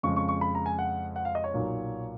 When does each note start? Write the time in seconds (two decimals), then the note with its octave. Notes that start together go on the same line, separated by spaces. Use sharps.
0.03 F2 C#3 G#3 C#6
0.16 C#6
0.28 C#6
0.41 B5
0.55 A#5
0.66 G#5
0.79 F#5
1.16 F#5
1.25 F5
1.35 D#5
1.44 C#5
1.54 B1 A#2 F#3